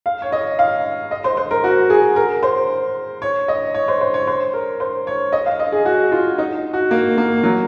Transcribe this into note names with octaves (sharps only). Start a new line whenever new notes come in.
F5
C#5
D#5
F5
D#5
C5
C5
A#4
F#4
G#4
A#4
C5
C#5
D#5
C#5
C5
C5
C#5
C5
A#4
C5
C#5
D#5
F5
D#5
G#4
F#4
F4
D#4
F#4
A#3
A#3
F#3